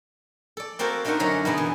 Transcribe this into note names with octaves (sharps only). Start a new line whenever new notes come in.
A4 D5
A#3 C4 F#4 G4 A4 A#4
A3 D4 D#4 A#4 C5 F#5
F#2 D3 C5 C#5 D#5 A#5
G2 B2 G3 B3 G#4 B5
E3